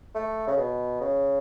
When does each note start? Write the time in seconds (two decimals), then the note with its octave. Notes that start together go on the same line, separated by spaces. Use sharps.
0.15 A3
0.47 C#3
0.58 B2
1.01 C#3